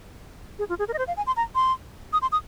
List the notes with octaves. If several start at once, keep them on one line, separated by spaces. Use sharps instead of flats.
G#4
F4
G#4
A#4
D#5
C5
F5
G#5
C6
A#5
C6
D#6
C6
D#6